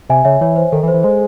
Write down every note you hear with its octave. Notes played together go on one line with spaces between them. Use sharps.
C3 E5 G#5
C#3 C#5 E5
E3 C#5
C5
D#3 A4
E3
C5
E3
G#3 C5